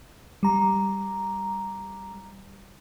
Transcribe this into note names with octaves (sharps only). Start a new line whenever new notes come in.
G3 A#5